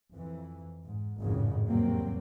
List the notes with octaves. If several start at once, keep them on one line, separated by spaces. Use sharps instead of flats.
F2 E3
G#2
G#1 F2 A2 C#3 F3 G#3
E2 C3 F#3 G3 A#3 C4